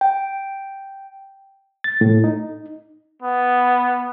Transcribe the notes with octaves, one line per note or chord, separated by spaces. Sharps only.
G5
A6
A2
D#4
B3